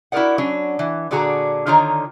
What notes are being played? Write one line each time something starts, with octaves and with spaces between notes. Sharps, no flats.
E4 F#4 G#4 A#4 D5 F#5
F#3 C#4 D4
E3
A#2 D3 D4 F#4 G#4 A#5
D3 D#3 D#4 F4 C#5 A#5